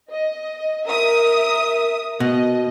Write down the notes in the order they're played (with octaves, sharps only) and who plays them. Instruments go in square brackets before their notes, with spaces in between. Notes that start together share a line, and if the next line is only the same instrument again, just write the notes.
[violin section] D#5
A#4 E5 D#6
[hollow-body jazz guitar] B2 [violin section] D#5